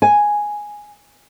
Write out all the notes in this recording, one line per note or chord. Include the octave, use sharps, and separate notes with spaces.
G#5